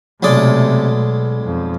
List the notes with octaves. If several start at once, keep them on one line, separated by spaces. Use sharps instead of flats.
B1 C3 G#3 A3 D5
B2
F2